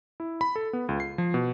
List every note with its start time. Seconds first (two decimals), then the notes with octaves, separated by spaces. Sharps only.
0.20 E4
0.41 B5
0.56 A4
0.73 B3
0.89 C#2
1.00 C7
1.18 F3
1.34 B2